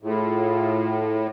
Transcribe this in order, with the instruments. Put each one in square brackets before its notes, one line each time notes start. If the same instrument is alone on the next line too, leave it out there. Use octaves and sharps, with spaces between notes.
[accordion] A2 [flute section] E4 F4 G#4